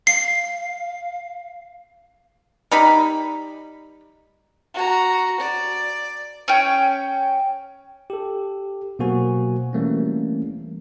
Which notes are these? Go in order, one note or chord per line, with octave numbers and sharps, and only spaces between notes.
F5 C7
G3 D#4 B5
F#4 A#5
D5
C#4 G5
G4 A4
B2 F#3 A#3 F#4 C5 G#5
E3 G3 A3 A#3 C4 C#4